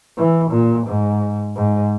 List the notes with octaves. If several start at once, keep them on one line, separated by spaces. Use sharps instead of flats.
E3
A#2
G#2
G#2